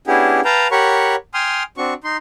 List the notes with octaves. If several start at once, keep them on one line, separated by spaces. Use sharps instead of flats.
B3 C#4 D4 E4 G4 G#4
B4 F5 G5 A5 A#5
G4 A#4 C#5 F#5 B5 C#6
G5 G#5 C6 D#6 F6
C4 D4 F#4 C#6
D#4 C6